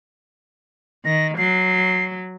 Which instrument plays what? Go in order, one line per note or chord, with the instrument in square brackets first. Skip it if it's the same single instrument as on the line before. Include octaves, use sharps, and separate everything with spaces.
[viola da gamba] D#3 [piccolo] A#6
[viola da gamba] F#3 [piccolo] C7